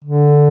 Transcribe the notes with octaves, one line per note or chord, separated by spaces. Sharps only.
D3